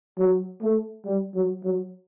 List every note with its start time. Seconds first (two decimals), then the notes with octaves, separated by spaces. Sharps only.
0.18 F#3
0.61 A3
1.05 G3
1.34 F#3
1.64 F#3